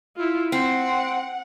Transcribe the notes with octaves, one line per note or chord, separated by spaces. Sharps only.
E4 F4
C4 F#5